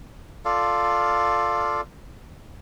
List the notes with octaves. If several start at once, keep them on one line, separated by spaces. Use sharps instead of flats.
F4 A4 D5 F5